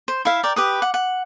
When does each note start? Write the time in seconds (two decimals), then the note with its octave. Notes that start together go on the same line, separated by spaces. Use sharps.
0.08 C5
0.25 E4 E5 F5
0.43 A#4 D5 G5
0.56 G4 B4 D#6
0.82 F#5
0.94 F#5